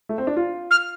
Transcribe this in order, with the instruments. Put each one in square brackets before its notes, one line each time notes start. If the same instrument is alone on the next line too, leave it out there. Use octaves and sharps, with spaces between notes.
[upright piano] A3
C4
D4
F4
[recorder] F6